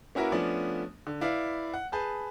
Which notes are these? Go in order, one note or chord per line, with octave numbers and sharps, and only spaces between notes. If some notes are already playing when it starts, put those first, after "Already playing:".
A#3 C#4 E4 F#4 A#4 B4
F3 A3 B3 C#4 D4
D3
E4 B4 D5 F5
F#5
G#4 B4 A5 G6